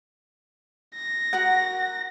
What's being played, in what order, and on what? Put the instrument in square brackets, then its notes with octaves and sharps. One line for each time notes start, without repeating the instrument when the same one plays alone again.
[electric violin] A#6
[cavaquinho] F#4 A#4 F#5